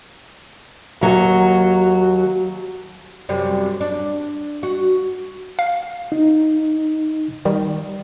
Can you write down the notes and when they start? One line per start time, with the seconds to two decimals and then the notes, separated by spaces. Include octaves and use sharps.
1.01 D#2 F#3
3.29 F#2 C3 G3
3.81 D4
4.63 F#4
5.59 F5
6.12 D#4
7.45 D#3 G3